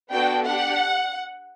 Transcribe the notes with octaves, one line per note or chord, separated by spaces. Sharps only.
B3 D4 F#4 A4 G5
D4 G4 F#5